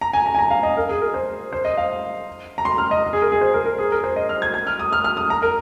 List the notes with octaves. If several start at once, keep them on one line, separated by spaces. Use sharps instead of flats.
A#5
G#5
A#5
G#5
A#5
F5
D#5
A#4
G#4
A#4
C5
C5
D#5
F5
A#5
C6
F6
D#5
G#4
A#4
G#4
C5
A#4
A#4
G#4
A#4
C5
D#5
F6
G#6
G#6
F6
D#6
F6
F6
D#6
A#5
A#4